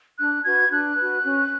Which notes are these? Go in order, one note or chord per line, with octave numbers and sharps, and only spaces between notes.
D4 F#6
F#4 B4 G#6
D4 F#6
F#4 B4
C#4